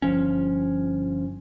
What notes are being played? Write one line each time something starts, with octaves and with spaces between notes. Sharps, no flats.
G1 D#2 F3 C#4